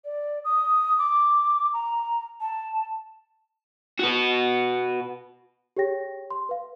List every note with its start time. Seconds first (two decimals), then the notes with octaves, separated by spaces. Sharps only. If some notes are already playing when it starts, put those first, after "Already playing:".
0.05 D5
0.44 D#6
0.98 D6
1.73 A#5
2.41 A5
3.99 F#4 B4
5.77 G4 G#4 C#5 G5 A#6
6.30 C6
6.49 B4 F5